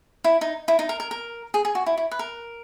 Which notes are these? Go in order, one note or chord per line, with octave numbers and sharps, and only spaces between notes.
E4
D#4
E4
D#4
A#4
A#4
A#4
G#4
G#4
F#4
E4
E4
B4
A#4